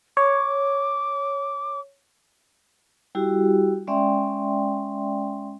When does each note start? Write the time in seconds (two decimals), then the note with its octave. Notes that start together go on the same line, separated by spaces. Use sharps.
0.17 C#5 D6
3.15 G3 E4 F#4 G4
3.87 G#3 C#4 D5 E5 G5 C6